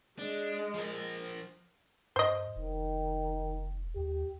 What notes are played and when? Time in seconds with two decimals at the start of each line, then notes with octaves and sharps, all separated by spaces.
0.19 G#3 D4
0.75 F3 A#4
2.16 G2 C5 D#5
2.56 F1 D#3
3.96 D#2 G4